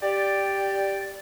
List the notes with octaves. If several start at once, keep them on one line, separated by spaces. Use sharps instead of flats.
G4 D5